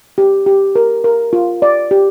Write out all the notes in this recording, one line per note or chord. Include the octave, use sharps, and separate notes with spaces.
G4
G4
A#4
A#4
F4
D5
G4